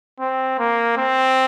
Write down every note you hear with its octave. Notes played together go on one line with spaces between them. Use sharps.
C4
A#3
C4